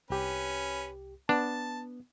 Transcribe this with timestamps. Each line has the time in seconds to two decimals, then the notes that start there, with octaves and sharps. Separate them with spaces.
0.10 C2 C#4 G4 B4
1.29 B3 D4 A5